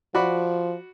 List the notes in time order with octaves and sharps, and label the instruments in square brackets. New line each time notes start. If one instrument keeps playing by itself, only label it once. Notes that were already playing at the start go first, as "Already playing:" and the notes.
[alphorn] F3 [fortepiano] F#4 D5 B5